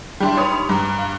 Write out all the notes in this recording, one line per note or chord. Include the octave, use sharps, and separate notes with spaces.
G3 D4 E4 G5 A5 C6
D#4 G4 B4 C#5 B5 D#6
G2 A#5 D6
F5